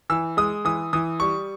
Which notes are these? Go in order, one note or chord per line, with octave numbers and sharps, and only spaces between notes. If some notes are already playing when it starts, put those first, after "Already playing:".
E3 E6
G#3 D#6
E3 D#6
E3 D#6
G3 C#6